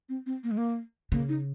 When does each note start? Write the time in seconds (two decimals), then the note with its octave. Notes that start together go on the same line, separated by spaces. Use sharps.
0.09 C4
0.26 C4
0.44 A#3
0.51 G#3
0.58 A#3
1.12 C#3 A#3
1.29 D#4